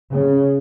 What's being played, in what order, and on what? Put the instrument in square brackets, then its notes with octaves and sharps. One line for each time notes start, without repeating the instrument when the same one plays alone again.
[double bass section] C#3